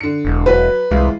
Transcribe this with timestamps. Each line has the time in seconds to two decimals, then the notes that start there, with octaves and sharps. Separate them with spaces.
0.01 D3 C#7
0.25 E1
0.46 F#3 B4
0.91 C2 E3 G#3 F4